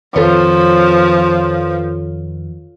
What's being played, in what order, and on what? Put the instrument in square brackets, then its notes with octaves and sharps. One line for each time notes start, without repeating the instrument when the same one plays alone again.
[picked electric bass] F2 D#3 C4 [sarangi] F3 [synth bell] A4 B4 C#5